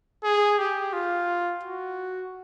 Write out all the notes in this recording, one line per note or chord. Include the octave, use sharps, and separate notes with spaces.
G#4
G4
F4
F#4